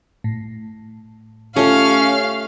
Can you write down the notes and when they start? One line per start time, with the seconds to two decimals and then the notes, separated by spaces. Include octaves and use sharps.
0.24 A2
1.56 A3 C#4 F4 G4 F5